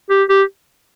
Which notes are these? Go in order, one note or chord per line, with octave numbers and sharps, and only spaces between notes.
G4
G4